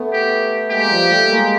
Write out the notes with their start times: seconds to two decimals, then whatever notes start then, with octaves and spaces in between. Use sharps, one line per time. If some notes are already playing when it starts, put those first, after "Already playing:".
Already playing: A3 B3
0.13 G4
0.71 G#3 A#3 G4
0.90 F3 G3
1.10 G3 A3
1.29 G#3 A#3